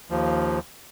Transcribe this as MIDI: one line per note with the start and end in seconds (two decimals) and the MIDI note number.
0.10 0.59 39
0.10 0.59 53